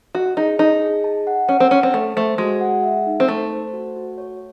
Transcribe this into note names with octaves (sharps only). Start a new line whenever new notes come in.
F#4 D#5
D#4 G#4
D#4 A5
G#4
A5
F#5
C#4 F#5
C4
C#4 A5
C4
A3 A4
A3 C5
G#3 F#4
F#5
E5
D#4
C4
A3 C5
C5
F#4
F#4
C#5